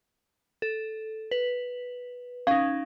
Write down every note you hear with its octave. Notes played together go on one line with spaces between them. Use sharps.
A4
B4
C#4 D#4 F5